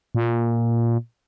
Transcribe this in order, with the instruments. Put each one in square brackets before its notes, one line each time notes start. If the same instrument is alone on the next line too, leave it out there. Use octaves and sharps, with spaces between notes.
[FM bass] A#2